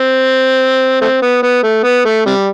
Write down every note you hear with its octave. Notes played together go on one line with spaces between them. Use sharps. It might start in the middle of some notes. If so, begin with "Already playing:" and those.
Already playing: C4
A3 C4
B3
B3
A3
B3
A3
C3 G3